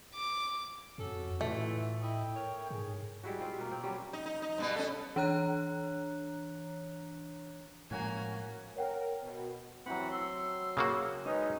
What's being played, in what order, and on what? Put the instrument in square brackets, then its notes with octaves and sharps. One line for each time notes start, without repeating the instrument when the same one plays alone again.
[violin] D6
[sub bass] F2 [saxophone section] C#4 A4 [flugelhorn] F#4
[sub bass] A2 [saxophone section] E3 F4 [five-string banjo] A3
[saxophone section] E4 D#5 E5 [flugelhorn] G5
[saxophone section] A#4 C#5
[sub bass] G#2 [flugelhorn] G#4
[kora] G3 G#3 E4 F#4
C4 F4
B2 A#3
C4
F#3 G3 C#4
[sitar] D#4
D#4
D#4
G2 B2 B3
C#4 A4
[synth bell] E3 D4 C#5 A#5 F#6
[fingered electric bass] A2 F3 G#3 [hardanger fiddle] A#3 G#5 [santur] C#4 F#4 C#5
[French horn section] A#4 [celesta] C#5 F#5 G5
[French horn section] B2
[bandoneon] E3 F#5 B5 [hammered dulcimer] F#3 C4
[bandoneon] C6 [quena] E6
[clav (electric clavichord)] C#3 A#3 F#4
[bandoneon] G#3 C#4 D#4 [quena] B4 [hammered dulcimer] D#5